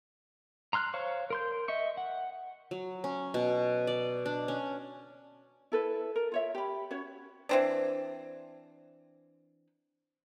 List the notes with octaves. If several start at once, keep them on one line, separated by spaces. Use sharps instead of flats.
A#5 C6 F6 F#6
C5 C#5 F5 C#6
A#4 C6 G6
D#5 E5 C#6
F#5
F#3
C#4
B2
D5
D4
C#4
E4 A4 B4
A#4
F4 C#5 E5
G4 B5
C#4 F#4 C#5
E3 C4 D4